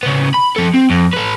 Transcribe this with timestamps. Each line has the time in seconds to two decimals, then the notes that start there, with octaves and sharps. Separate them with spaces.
0.03 C#3 B3
0.34 B5
0.56 F3 A4
0.74 C4
0.91 F2
1.14 A4 B4